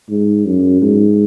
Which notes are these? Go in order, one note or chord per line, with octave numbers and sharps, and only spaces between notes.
G#2
F#2
G#2